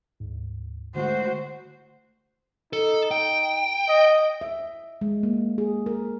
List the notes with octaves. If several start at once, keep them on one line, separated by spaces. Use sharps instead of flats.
D2 G#2
D3 G#3 A3 F#4 C5
D#4 A4
G5
D#5
E5
G#3
A#3
G#4
A#4